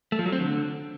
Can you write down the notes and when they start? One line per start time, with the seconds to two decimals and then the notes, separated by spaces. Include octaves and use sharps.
0.12 A3
0.19 F3
0.26 F#3
0.32 C4
0.39 D3